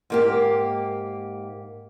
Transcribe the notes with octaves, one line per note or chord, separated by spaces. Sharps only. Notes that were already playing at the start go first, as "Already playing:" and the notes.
G#2 A#3 G4